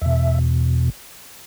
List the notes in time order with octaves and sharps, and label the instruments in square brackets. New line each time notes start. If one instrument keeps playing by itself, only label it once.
[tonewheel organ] E2 B2 E5